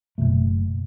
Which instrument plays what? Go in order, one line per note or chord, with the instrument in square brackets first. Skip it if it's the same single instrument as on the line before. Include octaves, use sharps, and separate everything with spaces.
[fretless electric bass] F#1 E2 B2 A3